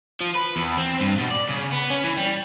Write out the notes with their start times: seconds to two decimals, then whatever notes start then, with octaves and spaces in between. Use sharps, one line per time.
0.20 F3
0.35 B4
0.56 E2
0.77 C4
1.00 G2
1.18 B2
1.31 D5
1.49 C#3
1.72 B3
1.90 C#4
2.04 E3
2.17 G3